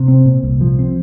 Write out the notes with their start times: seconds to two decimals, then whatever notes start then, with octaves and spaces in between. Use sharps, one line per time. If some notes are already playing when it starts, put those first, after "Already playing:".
Already playing: C3
0.08 C4
0.25 A#2
0.43 C2
0.61 F3
0.79 C4